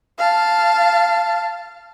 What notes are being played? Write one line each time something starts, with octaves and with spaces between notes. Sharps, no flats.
F5 A5